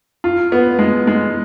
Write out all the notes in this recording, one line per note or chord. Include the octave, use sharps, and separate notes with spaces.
F4
B3
G#3
G#3